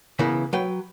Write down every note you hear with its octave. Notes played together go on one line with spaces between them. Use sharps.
C#3 E3 B3 E4 A#4
F#3 B4 G5